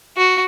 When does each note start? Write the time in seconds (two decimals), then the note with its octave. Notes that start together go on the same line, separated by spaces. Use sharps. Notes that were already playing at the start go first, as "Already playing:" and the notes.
0.17 F#4